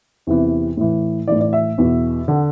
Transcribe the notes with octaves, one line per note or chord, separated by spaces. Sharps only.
E2 C3 E3
A2 E3
A2 E3 D5
D5
E5
E2 B2
D3 F#5